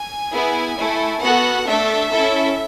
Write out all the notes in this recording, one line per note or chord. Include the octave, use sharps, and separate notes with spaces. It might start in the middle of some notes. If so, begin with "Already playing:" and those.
Already playing: G#5
B3 E4 G#4
A3 E4 A4
B3 F#4 A4 F#5
A3 D4 A4 E5
C#4 E4 A4